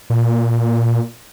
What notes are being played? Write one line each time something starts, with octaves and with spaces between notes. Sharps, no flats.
A#2